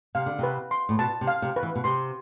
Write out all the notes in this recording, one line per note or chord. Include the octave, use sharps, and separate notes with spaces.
C3 F5
D3
C3 B4
C6
A2
B2 A5
C3
F5
C3
B4
E3
B2
C3 C6